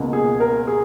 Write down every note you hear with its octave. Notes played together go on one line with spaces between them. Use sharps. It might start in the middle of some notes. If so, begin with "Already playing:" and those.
Already playing: C#2 B2 A#3
G#4
A#4
G#4